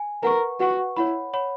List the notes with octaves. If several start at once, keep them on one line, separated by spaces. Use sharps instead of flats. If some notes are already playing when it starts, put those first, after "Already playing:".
Already playing: G#5
A#4 B4 F#5 C#6
F#4 B4 F#5 C#6
E4 C#5 F#5 B5
C#5 F#5 B5